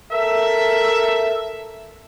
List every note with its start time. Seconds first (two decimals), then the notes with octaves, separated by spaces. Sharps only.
0.11 A4 A#4 E5